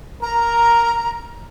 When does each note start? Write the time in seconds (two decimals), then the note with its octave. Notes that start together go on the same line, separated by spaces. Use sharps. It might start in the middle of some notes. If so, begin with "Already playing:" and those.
0.23 A#4 A#5